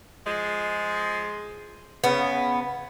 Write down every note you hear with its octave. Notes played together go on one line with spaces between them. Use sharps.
F3 G#3
C#3 B3